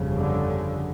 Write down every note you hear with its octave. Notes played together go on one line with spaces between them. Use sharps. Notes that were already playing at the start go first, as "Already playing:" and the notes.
Already playing: G1 F2 C#3
D3